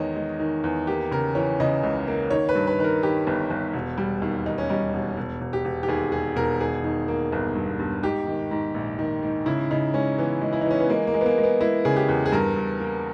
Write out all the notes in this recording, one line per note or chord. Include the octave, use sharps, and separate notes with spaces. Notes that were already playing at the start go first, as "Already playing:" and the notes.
Already playing: E2 D#3 G#3 C#5 D#5
G#3
D#3
E2
A#3 G4
C#3 A#4
E3 C#5
C#3 D#5
C#2
A#3
D#3 C#5
B4
G2
B4
D#3 B4
A#4
D#3 G4
G1
G1
E1
G3
D#2
D#2 D#4
C#4
G3 D#4
E1
E1
E1
G4
E1
G4
D#2 G#4
E1 G#4
E1 A#4
D#3 G#4
D#3
A#3
G1
G2
G2
G#2 G4
D#3
G#2
A#1
D#3
G#2
C#3 E4
C#3 D#4
G#3 C#4
E3 B3
G#3
E4
E3 D#4
C#4
B3
G#3 A#3
A#3
G#3
B3
A#3
G#3
B3
G#3 E4
C#3 G#4
G4
E2
G#4
G2 A#4
G2
A#3